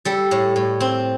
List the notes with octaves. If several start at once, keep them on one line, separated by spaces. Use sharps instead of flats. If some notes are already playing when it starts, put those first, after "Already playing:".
G3 A4
A2
A2
C4